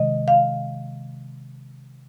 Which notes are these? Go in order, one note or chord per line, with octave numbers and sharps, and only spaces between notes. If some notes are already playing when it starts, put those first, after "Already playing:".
Already playing: C3 D#3 G#3 D#5
F5